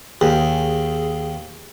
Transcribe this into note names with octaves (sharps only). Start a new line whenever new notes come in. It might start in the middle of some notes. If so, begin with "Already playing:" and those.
D#2 G#4